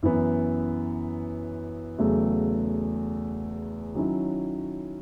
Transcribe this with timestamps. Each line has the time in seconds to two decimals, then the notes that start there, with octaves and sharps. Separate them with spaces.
0.03 F#2 E3 B3
1.98 E2 C#3 F#3 A3
3.94 D#3 F#3 C#4 E4